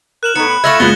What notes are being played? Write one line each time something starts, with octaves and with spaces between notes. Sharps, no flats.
A#4 F#6 E7 F#7
A2 B3 D#4 C#7
B5
A3 F4 E5 G#6 A#6 F#7
F#1 G#3 B3 F4 F#5 F#6 G#6 G7